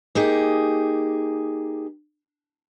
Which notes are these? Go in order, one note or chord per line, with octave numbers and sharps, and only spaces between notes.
A#3 D#4 G4 G#4